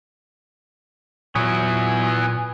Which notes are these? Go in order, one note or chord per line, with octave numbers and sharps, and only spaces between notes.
A#2 F#3 B3 E4 G#5